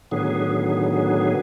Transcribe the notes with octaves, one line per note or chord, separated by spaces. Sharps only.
A2 D3 D#3 F#3 B3 G#4